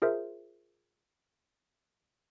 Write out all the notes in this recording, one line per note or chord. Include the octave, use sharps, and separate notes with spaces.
F4 G#4 A#4 C5 E5